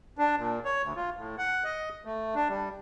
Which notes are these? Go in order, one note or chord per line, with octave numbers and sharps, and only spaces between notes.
D4
A#2
C#5
D2
F4
A2
F#5
D#5
A3
D4
G3